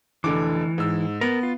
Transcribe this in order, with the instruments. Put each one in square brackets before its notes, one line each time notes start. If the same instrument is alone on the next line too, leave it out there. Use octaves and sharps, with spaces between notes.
[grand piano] F1 D3 D6 [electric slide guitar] E3
[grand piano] G#2 E6
[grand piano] B3 [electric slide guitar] A#4
[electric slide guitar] F4